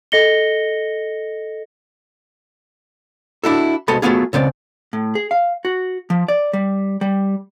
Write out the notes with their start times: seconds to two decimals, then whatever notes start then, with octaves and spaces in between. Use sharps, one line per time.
0.12 A4 D#5 A#6 C#7 G7
3.44 D4 E4 F#4 A4
3.88 C2 B2 G#3 A4 B5
4.02 F#3 G#3 A3 B3 F4 G#4
4.33 C#2 C#3 C4 D5
4.93 A2
5.15 G#4
5.31 F5
5.65 F#4
6.10 F3
6.28 D5
6.53 G3
7.01 G3